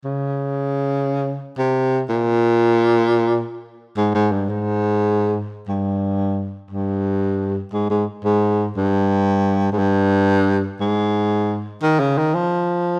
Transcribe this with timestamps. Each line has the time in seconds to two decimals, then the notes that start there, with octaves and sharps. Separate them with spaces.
0.05 C#3
1.58 C3
2.09 A#2
3.97 G#2
4.15 G#2
4.32 G2
4.49 G#2
5.68 G2
6.71 G2
7.73 G#2
7.90 G#2
8.25 G#2
8.76 G2
9.72 G#2
9.78 G2
10.80 G#2
11.83 D#3
12.00 C#3
12.18 D#3
12.35 F3